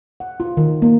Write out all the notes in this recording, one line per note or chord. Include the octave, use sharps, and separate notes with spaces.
F#5
F4
D#3
A#3